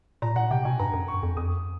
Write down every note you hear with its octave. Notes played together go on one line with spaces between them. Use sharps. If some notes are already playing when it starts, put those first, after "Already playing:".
A#2 A#5
A#2 F#5
C3 G5
B2 G#5
G2 A#5
F#2
C#6
F2
F2 D#6